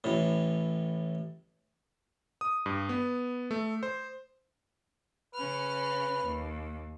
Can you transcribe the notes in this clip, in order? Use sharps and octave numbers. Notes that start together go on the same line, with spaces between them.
A1 A2
D#6
G2
B3
A3
C5
C#3 C#4 B4 F6
D#2